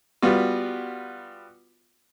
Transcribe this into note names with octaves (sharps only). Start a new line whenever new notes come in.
G3 B3 F4 F#4